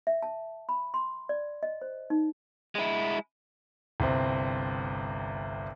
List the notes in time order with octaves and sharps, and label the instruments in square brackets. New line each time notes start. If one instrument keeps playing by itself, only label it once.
[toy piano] E5
A5
B5
C6
D5
D#5
C5
D#4
[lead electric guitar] G#3 E4
[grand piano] G1 C2 C4